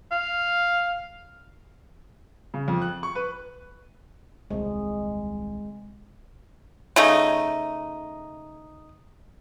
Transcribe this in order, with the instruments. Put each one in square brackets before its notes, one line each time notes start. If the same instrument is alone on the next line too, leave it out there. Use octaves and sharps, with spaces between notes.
[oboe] F5
[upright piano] C#3
F2
F#6
C#6
B4
[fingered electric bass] D#1 C2 [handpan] G#3
[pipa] C#3 A3 D#4